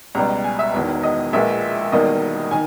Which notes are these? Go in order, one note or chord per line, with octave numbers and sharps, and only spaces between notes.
C#2 B2 G3 A#5
G#5
E5
E1 E2 D#3
D#5
A#1 A#2 G#3 B3 E5
E1 E2 D#3 G3 A#3 D#5
D#3 G#5